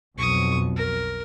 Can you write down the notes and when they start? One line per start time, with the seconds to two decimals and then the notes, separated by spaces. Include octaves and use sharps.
0.18 B1 F2 C#6 D#6
0.76 A#4